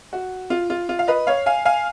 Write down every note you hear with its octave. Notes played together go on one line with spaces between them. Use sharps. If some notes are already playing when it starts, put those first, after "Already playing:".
F#4
F4
F4
F4
F5
B4 D#5
C#5 F5
F5 G#5
F5 G#5